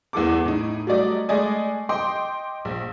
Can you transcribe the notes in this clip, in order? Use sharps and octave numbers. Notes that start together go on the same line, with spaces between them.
E2 E3 A4 D6
A2 D#4
F#3 G3 A3 D5 D#5
G#3 A3 D5 D#5 G#5
D#5 G5 C6 D6
A#1